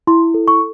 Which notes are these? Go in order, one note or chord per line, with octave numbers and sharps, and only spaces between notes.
E4 C6
A4
C#6